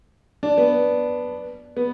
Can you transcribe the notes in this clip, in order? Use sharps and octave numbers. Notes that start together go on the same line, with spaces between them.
D4
B3
B3